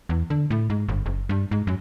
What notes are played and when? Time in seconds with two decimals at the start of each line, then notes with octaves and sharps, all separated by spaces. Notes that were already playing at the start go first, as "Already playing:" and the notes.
0.09 E2
0.30 D3
0.51 A2
0.70 G#2
0.89 G1
1.06 F#1
1.29 G2
1.51 G#2
1.67 F#2